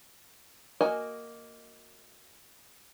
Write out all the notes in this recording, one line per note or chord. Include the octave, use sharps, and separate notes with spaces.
A#3 F#4 A#4 D#5 G#5